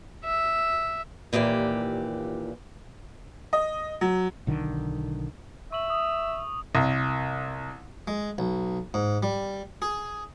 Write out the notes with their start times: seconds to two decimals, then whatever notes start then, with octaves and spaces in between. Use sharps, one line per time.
0.24 E5
1.33 D#2 A#2 E3 G4 D5
3.53 D#5
4.01 F#3
4.47 B1 D3 D#3
5.72 E5 C#6 F#7
5.90 D#6
6.75 C2
8.08 G#3
8.38 B1
8.94 G#2
9.23 G3
9.82 G#4